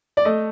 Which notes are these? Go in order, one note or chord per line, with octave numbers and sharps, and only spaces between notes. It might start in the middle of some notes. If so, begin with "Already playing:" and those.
D5
A3 D#5